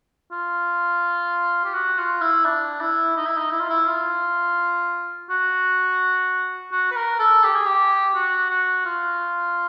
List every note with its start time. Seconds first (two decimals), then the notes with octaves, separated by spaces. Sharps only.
0.32 F4
1.65 G4
1.74 F#4
1.98 F4
2.22 E4
2.45 D4
2.80 E4
3.17 D#4
3.27 E4
3.37 D#4
3.52 E4
3.60 F4
3.70 E4
3.87 F4
5.30 F#4
6.72 F#4
6.91 B4
6.96 A#4
7.19 A4
7.44 G4
7.55 G#4
7.66 G4
8.15 F#4
8.50 F#4
8.86 F4